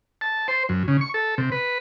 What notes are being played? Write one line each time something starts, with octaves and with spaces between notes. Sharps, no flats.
A5
C5
F#2
C#3
C#6
A4
C3
B4